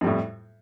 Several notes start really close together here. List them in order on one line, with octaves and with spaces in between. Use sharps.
F2 G3 A2